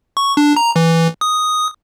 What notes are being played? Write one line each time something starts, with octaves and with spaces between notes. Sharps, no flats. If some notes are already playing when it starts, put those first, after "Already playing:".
C#6
D4
A#5
E3
D#6